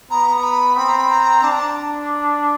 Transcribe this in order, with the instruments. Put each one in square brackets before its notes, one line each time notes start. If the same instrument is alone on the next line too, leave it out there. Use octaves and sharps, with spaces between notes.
[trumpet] B3 [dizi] A#5
[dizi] A#5
B5
[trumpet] C4 [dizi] B5
[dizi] A#5
B5
A#5
[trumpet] D4 [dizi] A5
[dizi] A#5
A5